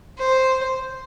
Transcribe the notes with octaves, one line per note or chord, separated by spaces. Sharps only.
C5